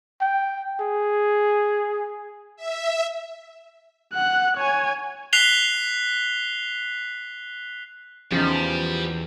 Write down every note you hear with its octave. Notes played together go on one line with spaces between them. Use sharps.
G5
G#4
E5
F#5 F#6
C#5 G#5
F#6 B6 C7 F7 G7
E2 C#3 F3 G3 D#4